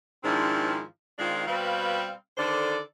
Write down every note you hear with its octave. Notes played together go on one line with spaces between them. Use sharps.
G#2 D#3 F3 C4 D4 E4
D#3 G#3 C4 D4 F4
B2 G3 C4 B4 F5
D3 D#3 A4 C5 D5